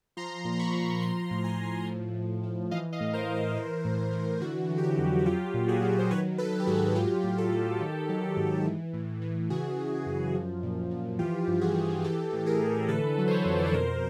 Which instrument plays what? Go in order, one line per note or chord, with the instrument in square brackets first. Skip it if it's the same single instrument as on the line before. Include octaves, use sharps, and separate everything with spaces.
[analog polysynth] F3 A#5 C6
A#2
C6
B5 C#6
F3
F3 A#5 C6
A2
G#5 A#5
F3
F3
A2
F3
E3 D#5 F5
D#5 F5
A2
A#4 C5
E3
A#4 C5
E3
A2
E3
D3 F#4
F#3
G4
F#4
F2
F#4
F#3 F4 G4
A#2
F#4 G#4
F#3
C5
D#3 B4 C#5
F#3 A4 B4
G4
G#2 F#4 G#4
F#3 F4 G4
A2
G4 A4
F#3
D#3
F#3
G#2
E3
A2
E3
C#3 F#4 G#4
E3
F#2
F3
A#2
F3
E3 F4 G4
G2
F#4 G#4
E3
E3 G4 A4
A2
G#4 A#4
E3
D3 A4 B4
F#3
C5
B4 C#5
F2
D5
C#5
B2 A#4 C5